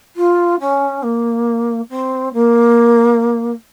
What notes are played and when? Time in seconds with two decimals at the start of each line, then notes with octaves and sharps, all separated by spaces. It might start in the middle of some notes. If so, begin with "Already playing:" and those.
0.16 F4
0.60 C#4
1.03 A#3
1.90 C4
2.34 A#3